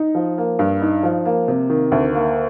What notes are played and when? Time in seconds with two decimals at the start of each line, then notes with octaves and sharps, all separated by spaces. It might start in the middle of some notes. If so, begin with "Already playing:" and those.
Already playing: D#4
0.15 F3
0.38 A#3
0.59 G2
0.82 D#4
1.03 F3
1.26 A#3
1.48 C3
1.70 D#3
1.92 D2
2.15 A#3